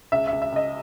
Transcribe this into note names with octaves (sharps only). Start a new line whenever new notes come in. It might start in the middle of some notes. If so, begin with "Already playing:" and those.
C#2 E5
E5
C#2
E5
C#2 D#5